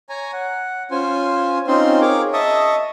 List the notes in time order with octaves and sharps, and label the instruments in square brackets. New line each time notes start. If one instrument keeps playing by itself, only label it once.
[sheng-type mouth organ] C#5 G#5 A#5
F#5
C#4 F4 C5 G#5
C4 C#4 D#4 F4 C5 C6
G#4 A#4 C#5 D6
D#5 E5 A5 C#6 D#6